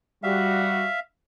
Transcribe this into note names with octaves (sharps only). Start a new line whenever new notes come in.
G3 F#4 E5 F5